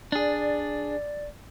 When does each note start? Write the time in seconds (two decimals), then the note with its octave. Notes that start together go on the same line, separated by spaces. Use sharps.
0.12 D4 G#4 D5